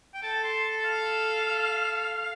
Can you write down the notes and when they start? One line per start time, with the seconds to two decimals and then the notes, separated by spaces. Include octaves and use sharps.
0.14 G5
0.23 A4 A5
0.44 C6
0.64 A5
0.84 F5